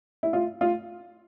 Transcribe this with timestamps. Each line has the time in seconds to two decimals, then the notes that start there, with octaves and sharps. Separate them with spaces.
0.23 E4
0.33 F4
0.61 F4